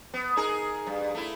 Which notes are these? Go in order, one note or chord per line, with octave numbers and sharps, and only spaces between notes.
B3
D#4 G#4 A#4
G2
A3 E4